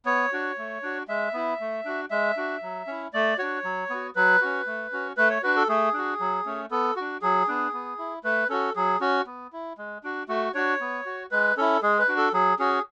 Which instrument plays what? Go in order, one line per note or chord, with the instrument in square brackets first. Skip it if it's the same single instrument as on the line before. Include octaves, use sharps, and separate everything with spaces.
[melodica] B3 C#5
D4 F#4
A3
D4 F#4
G#3 E5
B3 E4
A3
D4 F#4
G#3 E5
D4 F#4
F#3
C#4 E4
A3 D5
D4 F#4 C#5
F#3
B3 F#4
F#3 B4
C#4 F#4
A3
C#4 F#4
A3 B4
C#5
D4 F#4 B4
A4
A3 G#4
D4 F#4
F#3
A3 C#4
B3 A4
F#4
D4
F#3 G#4
B3 D4
B3
E4
A3 B4
C#4 F#4 A4
F#3 G#4
C#4 F#4
B3
E4
G#3
D4 F#4
A3 F#4
D4 F#4 C#5
B3
F#4
G#3 B4
C#4 E4 A4
G#3 G#4
B4
D4 F#4
A4
F#3 G#4
C#4 F#4 G#4